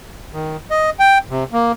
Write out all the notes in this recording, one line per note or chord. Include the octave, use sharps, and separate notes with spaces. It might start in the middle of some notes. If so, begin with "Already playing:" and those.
D#3
D#5
G5
C3
A#3